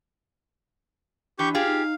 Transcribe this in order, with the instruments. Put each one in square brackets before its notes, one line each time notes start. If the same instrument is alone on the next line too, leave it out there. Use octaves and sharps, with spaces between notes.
[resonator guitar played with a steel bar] E3 [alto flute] D4 [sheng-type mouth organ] G4 C#6 G6
[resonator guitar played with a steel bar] F4 G4 G#4 [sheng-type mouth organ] F5
[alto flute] D#4